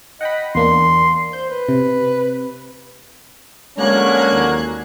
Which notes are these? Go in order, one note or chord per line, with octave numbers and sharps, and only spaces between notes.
D#5 F#5 G5 B5
E2 A#3 D4 C6
C5 G6
B4
C3
D3 F#3 G#3 A#3 C#4 A#5 F#6 G#6
D#2